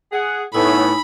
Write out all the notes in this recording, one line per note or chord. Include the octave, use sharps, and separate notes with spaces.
G#4 F#5
A2 B3 D#4 C#5 G#5 B5 E6